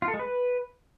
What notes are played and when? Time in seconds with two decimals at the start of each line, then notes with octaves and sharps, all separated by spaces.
0.02 F4
0.08 A4
0.14 G#3
0.19 B4